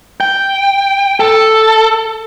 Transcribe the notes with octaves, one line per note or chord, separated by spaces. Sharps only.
G5
A4